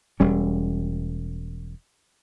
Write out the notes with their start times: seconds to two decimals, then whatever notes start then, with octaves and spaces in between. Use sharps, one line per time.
0.20 E1 G3 C#4